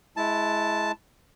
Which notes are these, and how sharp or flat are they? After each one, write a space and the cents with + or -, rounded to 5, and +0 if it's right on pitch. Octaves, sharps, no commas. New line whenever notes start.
G#3 +25 E4 +0 A5 +0